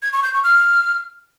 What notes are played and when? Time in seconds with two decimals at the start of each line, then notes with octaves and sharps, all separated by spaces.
0.02 G#6
0.13 C#6
0.23 G6
0.33 C#6
0.44 F6